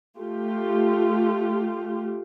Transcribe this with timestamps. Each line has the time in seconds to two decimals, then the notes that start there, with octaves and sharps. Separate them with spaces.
0.19 A3 F4 G4